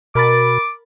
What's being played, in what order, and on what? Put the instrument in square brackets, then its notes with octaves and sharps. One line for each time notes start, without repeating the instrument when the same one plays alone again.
[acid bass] B2 [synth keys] A#4 B5 A6 [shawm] D6